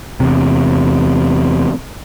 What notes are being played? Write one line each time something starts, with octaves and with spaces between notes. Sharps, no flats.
E2 C3